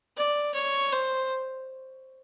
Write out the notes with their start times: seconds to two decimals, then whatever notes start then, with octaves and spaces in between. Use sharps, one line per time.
0.17 D5
0.54 C#5
0.92 C5